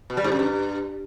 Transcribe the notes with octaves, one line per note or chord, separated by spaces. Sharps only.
B2
G3
G#2
F#2
G2